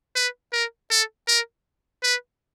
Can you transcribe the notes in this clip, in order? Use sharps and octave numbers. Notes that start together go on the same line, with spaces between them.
B4
A#4
A4
A#4
B4